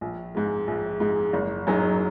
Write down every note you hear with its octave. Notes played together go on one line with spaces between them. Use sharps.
A#1
G#2 G#3
A#1
G#2 G#3
F#1
F#2 F#3 D#4 G#4